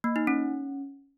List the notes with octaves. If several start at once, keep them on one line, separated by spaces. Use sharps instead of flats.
A#3
D#4
C#4